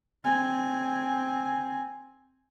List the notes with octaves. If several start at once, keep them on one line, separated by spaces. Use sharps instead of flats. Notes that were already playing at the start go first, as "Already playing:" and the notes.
C4 G#5